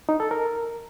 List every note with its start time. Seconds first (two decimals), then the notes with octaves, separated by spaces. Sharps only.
0.09 D#4
0.20 A4
0.31 A#4